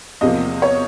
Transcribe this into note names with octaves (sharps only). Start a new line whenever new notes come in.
E2 C3 F3 A#3 D#5
C#5